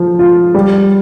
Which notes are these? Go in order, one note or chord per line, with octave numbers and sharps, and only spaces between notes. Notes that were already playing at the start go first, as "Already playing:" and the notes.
Already playing: F3
F4
G3